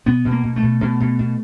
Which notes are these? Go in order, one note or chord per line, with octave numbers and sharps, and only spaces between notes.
B2 B3
B2
A#3
B2
A3
B2
B2
B2
B2